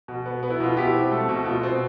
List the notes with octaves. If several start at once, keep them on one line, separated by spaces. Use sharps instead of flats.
B2
B3
B3
E4
B2 F4
B2 E4 G4
C4
A3
B2
B2 F4
C4